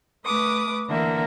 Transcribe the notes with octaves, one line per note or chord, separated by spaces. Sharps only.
A3 B4 D6 D#6
D3 E3 A#3 A#4 E5